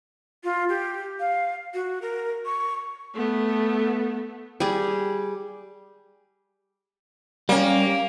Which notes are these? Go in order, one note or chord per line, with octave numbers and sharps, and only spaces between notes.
F4
G4
F5
F#4
A#4
C#6
A3 B3
G3 G#4
G3 A#3 C#4